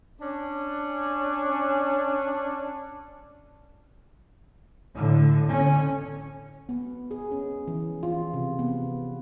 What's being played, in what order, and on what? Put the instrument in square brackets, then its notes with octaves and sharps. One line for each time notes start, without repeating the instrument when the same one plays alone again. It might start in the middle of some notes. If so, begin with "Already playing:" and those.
[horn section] C#4 D4
[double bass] A2 D3
D3 C#4
[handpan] B3
G#4
C#4
E3
F4
C3
B3